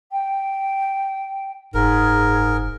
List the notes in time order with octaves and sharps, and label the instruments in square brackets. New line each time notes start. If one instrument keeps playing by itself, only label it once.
[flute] G5
[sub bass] F#1 [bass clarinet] G#2 [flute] G#4 [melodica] A#4